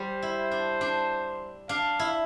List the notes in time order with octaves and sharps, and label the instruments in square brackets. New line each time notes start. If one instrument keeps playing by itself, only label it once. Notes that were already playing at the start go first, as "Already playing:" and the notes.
Already playing: [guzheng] G3 [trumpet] C5
[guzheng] E4
D4
D4
[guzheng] D4 [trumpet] F5
[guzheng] E4